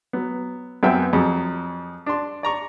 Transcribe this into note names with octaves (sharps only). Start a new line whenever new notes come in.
F#3 B3
F#2 B3 C4 A#4 E5 G5
F2 F#3 C4 G#4
D4 C6
D5 A#5 C#6